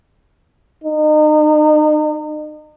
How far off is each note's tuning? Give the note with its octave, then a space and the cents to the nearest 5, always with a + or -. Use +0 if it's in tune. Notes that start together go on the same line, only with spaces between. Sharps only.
D#4 -35